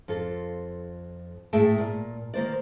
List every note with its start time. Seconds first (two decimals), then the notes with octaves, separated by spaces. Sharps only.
0.08 F2 F4 A4
1.53 A2 A3 G#4 E5 G5 A5
1.78 A#2
2.34 D#3 A#3 C5 D5